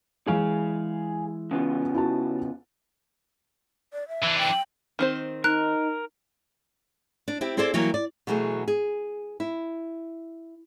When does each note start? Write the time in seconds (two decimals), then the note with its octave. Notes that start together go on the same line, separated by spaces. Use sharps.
0.27 E3 G#3 E4 G#4 F5
1.51 C#3 B3 F4
1.95 E4 F#4 A5
3.93 D5
4.08 E5
4.23 E3 D4
4.39 G5
4.99 D#3 C4 C5
5.44 D#4 A#4 F#6
7.28 D4
7.41 C4 E4 G4
7.57 C4 E4 G#4 A4 C5 D5
7.74 E3 F#3 G3 A#3 A#4 C#5
7.94 D5
8.27 B2 E3 F#3 A3 G#4
8.68 G#4
9.40 E4